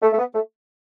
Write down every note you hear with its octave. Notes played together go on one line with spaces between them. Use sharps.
A3
A3
B3
A3